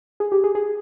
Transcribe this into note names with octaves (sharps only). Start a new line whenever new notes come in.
G#4
G4
G#4
G#4